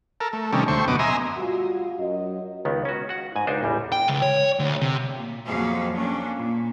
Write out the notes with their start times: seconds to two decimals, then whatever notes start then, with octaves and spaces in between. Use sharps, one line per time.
0.21 A4 A#4
0.33 A3
0.53 C3 D#3 G3 A3 C#4
0.68 D2 A3 C5 C#6
0.88 F#2 B2 B3 D#5 D6
0.99 D#5 E5 G#5 A#5 C6
1.36 G3 F4 F#4
1.98 F#2 D#5
2.65 C#2 D#3 B3
2.85 C#4 F#4
3.09 F#4 F#5
3.36 G#2 G#5
3.47 C#2 G#3 D4 D#4 C5
3.63 A1 E2 G3
3.92 G5
4.08 C#2
4.22 C#5
4.59 D2
4.81 C3
5.15 A#2
5.46 F2 F3 F#3 A#3 G#4 F5
5.94 A#3 C#4 D4
6.37 A#2